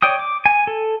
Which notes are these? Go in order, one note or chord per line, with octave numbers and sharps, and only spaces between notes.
C#5 D5 G5 D#6
D6
G#5
A4